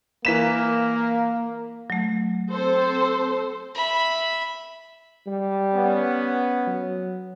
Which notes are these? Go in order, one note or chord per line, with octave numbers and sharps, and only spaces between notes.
E3 A#3 B6 E7
F#3 A3
C4 A4 C5
E5 B5
G3
B3 C#4
F#3